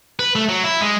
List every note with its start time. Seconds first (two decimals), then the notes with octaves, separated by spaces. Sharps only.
0.19 B4
0.35 A3
0.49 F#3
0.64 E4
0.81 G#3